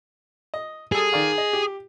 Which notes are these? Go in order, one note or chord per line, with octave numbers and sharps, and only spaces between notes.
D#5
G3 G#4 A4
D#3 D5 F5
D#5
G4